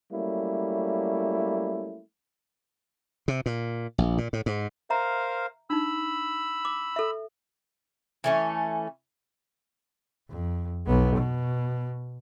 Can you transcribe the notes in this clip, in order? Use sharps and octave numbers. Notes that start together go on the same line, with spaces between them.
F#3 G3 A3 A#3 C#4 E4
C3
A#2
A#1
A#2
A2
G#2
A#4 C5 E5 F5 A#5
D4 D#4 B5 E6
D6
A4 E5
E3 A3 C#4
F2
B1 B3
B2